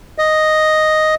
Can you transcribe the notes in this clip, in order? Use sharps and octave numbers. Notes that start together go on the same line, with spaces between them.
D#5